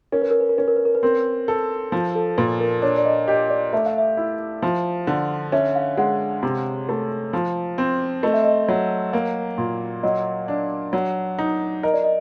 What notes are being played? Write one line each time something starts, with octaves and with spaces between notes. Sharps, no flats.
C#4 A#4
B4
A#4
B4
A#4
C#4 B4
A#4
B4
A#4
B4
C4 A#4
A4
F3
A4
A#2 B4
A#4
D4 C#5
D5
D#5
G4 D#5
D5
A3 E5
F5
E5
E4
F3
D3
C#4 E5
F5
G#3 F#5
C3
A3
F3
C4
A3 D#5
E5
D#5
F#3
A#3
A#2
F#3 D#5
D4
F#3
D#4
A#4 D#5
D5
D#5